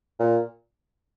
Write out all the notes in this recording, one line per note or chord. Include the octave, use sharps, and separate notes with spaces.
A#2